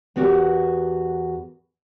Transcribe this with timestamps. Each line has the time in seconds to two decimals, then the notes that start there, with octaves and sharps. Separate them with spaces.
0.16 E2 B3 F#4 G4 A#4